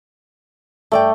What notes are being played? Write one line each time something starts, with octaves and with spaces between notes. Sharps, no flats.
G2 A3 D5 G5